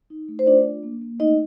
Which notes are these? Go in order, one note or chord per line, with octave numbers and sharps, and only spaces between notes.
D#4
A3
C5
D4 F4 D5
D4
A#3
A#3
A3 D#4 D#5